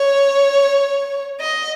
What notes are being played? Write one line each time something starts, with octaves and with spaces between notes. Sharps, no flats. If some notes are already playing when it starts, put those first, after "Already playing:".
Already playing: C#5
D#5